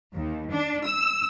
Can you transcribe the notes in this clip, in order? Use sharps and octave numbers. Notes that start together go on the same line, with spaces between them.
D#2
D4
E6